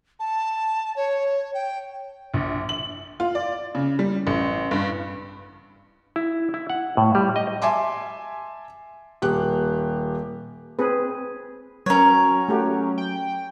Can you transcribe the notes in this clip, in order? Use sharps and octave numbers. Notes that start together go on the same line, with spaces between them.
A5
C#5
G5
A#1
F#7
F4
D5
C#3
G3
A1
G2
E4
E4
F#5
A2
G3
D#5
E5 G#5 A5 C6 D6
D#1 G4 F#6
C4 G#4 B4
F#3 C#4 A#4 C#5
A3 F#4 G4
G5